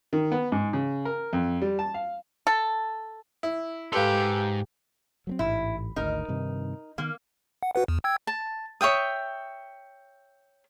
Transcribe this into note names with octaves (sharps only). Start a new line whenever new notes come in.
D#3
B3
G#2
C#3
A#4
F2
G3
A5
F5
A4
E4
G#2 G4 A4 B4 F5 C6
F#3 A3 C4
A1 G#2 E4
G#1 D2 D#4 A#4
G2 C3 D#3
D#3 A#3 B3
F#5
F#4 B4 F#5
E2
G5 E6 G#6
A5
C#5 E5 G5 D#6